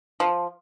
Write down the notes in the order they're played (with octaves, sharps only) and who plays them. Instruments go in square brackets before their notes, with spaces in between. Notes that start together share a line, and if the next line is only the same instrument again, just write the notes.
[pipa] F3